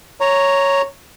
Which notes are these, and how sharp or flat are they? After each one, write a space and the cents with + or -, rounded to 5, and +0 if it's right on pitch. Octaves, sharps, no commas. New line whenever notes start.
C#5 +0 A#5 +0